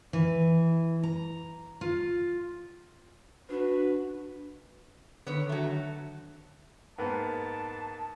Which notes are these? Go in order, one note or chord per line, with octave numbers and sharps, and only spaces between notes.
E3
A#5
F4
D4 F#4 B4
D3 D#3 B3 C#5
F#3 A3
G#2 A#3 B3 A5